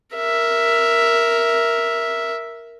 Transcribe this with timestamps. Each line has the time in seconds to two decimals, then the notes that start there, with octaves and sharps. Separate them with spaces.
0.16 A#4 E5